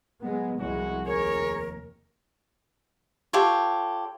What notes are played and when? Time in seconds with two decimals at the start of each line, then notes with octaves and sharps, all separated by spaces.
0.23 F#3 G#3 B3
0.59 C2 F2 G#3 C#4 E4 F#4
1.06 F1 D#2 G#4 A#4 C#5
3.33 F4 G4 A4 C#5